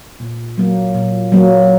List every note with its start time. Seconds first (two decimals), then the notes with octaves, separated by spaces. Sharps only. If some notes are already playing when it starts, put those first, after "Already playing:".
0.20 A#2
0.57 F#3 A#3
0.95 A#2
1.32 F#3 A#3